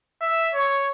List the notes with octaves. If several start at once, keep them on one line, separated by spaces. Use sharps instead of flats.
E5
C#5